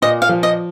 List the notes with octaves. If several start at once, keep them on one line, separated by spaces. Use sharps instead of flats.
A#2 D#5
F5
F3
D#5